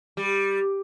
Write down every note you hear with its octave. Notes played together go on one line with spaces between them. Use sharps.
G3